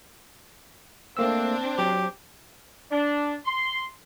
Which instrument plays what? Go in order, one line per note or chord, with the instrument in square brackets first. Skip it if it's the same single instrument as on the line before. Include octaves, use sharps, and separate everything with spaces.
[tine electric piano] A3 A#3 E6 [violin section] C4 D4
[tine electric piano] F#3 [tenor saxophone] G4
[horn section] D4
C6